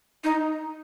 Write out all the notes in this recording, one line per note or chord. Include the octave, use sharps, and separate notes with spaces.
D#4